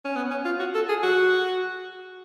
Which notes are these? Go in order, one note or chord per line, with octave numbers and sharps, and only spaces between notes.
C#4
B3
C#4
F4
F#4
A4
G#4
F#4